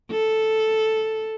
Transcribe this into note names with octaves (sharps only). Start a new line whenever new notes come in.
A4